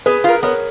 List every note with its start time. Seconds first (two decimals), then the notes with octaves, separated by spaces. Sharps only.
0.06 B3 G#4 B4
0.24 F4 A#4
0.43 B3 A#4 C#5